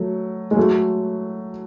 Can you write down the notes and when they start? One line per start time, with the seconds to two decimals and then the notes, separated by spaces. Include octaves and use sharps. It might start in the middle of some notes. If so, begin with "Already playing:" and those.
Already playing: F#3 A3
0.51 G#3
0.57 F#3 A3